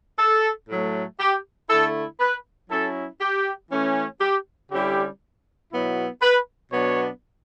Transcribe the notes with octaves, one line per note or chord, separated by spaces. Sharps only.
A4
A2 F#3 A3
G4
D3 A3 E4 A4
B4
F#3 C#4 E4 A4
G4
E3 A3 C#4
G4
D3 G3 C#4 E4 G4
B2 F#3 B3 E4
B4
B2 F#3 B3 D4 C#5